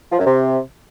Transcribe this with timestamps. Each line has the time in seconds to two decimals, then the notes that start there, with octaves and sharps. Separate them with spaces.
0.12 F3
0.19 F#2
0.26 C3